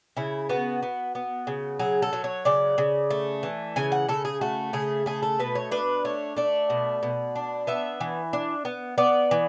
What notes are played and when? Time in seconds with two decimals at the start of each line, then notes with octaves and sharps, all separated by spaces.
0.17 C#3 E4
0.49 B3 F#4
0.83 B3
1.15 B3
1.47 C#3
1.79 F#3 G#4
2.02 A4
2.13 F#3
2.24 C#5
2.45 C#3 D5
2.78 C#3
3.10 A3
3.43 E3
3.76 C#3 G#5
3.92 F#5
4.09 C#3 A4
4.25 G#4
4.41 A3 F#4
4.73 C#3 G#4
5.06 A3 G#4
5.23 A4
5.39 B2 B4
5.55 C#5
5.71 D4 B4
6.05 A3 C#5
6.36 A3 D5
6.70 B2
7.03 B2
7.36 D4
7.67 B3 E5
8.01 E3
8.33 D4
8.65 B3
8.98 B3 D5
9.31 E3